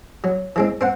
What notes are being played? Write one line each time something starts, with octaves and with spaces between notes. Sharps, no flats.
F#3
E3 G#3 C4
C4 C5 F#5